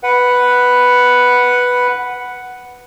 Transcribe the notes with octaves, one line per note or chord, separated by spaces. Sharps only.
B4 F#5